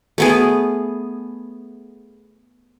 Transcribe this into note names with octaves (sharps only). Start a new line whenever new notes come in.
A3 B3 G#4